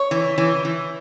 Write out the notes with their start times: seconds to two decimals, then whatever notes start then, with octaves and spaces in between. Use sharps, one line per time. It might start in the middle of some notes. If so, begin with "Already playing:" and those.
Already playing: C#5
0.11 E3
0.38 E3
0.65 E3